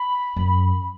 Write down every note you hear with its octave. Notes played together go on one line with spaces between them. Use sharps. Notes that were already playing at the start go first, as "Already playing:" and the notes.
Already playing: B5
F#2